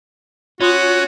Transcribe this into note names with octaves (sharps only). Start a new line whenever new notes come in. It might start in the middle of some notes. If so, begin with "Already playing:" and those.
C#4 F4 F#4 C6 D#6